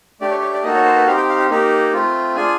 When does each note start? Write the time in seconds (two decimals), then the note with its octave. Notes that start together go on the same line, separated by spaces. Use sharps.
0.21 A3 D4 G4 D5
0.31 C#5
0.42 C#5
0.53 D5
0.63 A#3 D#4 F#4 A4 D#5
0.75 C#5
0.86 C5
0.96 B4
1.07 C4 D#4 G4 F5
1.17 G5
1.29 F5
1.39 F5
1.50 A#3 D#4 G4
1.93 A3 C4 F4
2.36 D4 F4 G#4 G#5